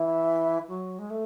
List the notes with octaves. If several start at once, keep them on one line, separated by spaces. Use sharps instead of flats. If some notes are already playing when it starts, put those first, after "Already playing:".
Already playing: E3
F#3
G#3
A3